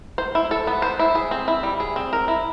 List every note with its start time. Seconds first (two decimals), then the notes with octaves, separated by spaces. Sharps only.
0.18 C5
0.35 E4
0.51 A4
0.67 B3
0.82 C5
0.99 E4
1.15 G#4
1.31 C4
1.48 E4
1.63 G3
1.80 G#4
1.96 C4
2.13 A#4
2.28 E4